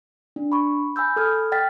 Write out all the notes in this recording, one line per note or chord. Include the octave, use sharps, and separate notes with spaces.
D4
B5 C#6
G#5 B5 E6 G6
A4 D#6 F6 G#6
D#5 G5 F6 A6 B6